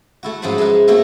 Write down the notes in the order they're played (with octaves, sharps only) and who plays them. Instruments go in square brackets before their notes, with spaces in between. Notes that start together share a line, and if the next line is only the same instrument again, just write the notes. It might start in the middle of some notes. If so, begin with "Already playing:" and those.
[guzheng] A3 E4 F#4
G#2 F3 F#3 C#4 C5 B5
G#3 D#4 E4 B4
A3 A#3 C4 E4 F#4 G4